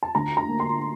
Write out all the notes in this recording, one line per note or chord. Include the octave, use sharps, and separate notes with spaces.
A5
D2 A#5
A#5
A#3
C6